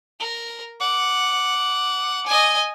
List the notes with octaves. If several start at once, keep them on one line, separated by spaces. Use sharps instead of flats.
A#4
F#5 D6
D#5 G#5